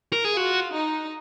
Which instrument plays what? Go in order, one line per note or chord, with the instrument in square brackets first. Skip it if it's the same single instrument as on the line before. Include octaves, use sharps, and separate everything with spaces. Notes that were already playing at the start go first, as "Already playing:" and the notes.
[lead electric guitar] A#4
G#4
[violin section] F4 [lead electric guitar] F#4
[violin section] D#4